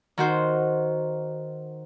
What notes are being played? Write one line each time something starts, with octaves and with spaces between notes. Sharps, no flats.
D#3 F#4 C5